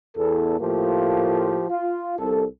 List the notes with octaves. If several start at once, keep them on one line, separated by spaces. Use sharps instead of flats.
E2 A4
A2 F3 A3 A#3 F4 G4
F4
C2 A4